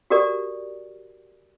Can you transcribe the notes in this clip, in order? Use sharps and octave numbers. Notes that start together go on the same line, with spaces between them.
F#4 G4 A4 A#4 D5